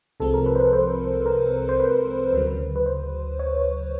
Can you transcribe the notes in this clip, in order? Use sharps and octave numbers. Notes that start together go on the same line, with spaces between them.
C2 C3 F3 G#3 C4 A4
A#4
B4
C5
B4
C5
A#4
C5
B4
D2 C#3 F#3 B4
B4
C5
C#5